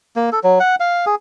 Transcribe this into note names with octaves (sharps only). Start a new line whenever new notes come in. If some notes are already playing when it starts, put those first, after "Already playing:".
A#3
A4
F#3
F#5
F5
G#4